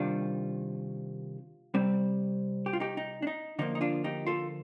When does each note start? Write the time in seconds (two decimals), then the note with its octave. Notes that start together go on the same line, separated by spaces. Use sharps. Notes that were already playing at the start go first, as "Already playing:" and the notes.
Already playing: C3 D#3 G3 D4 F4
1.74 C3 G3 C4
2.66 G4
2.73 F4
2.80 D#4 G4
2.97 D#4
3.22 D4
3.27 D#4
3.59 D3 F3 A#3 D#4
3.75 D#4
3.81 D4 F4
4.04 D#4 G4
4.27 F4 A4